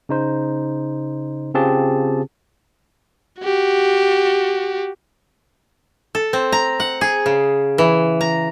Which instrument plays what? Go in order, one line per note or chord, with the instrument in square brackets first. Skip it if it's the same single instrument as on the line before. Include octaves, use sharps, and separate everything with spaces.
[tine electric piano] C#3 D#4 C5
C#3 C4 F4 G4 G#4 A5
[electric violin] F#4 G4
[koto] A4
C4
A#5
F#5
G#4
C#3
E3
A#5